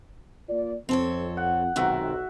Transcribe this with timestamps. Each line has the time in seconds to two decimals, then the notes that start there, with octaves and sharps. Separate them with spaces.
0.49 A#3 F4 D5
0.89 F2 C4 A4 C#5
1.37 F#5
1.76 B1 G#2 C3 D#3 F#4 E5